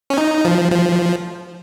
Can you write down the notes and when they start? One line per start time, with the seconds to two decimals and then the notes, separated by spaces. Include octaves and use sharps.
0.10 C#4
0.18 D#4
0.45 F3
0.72 F3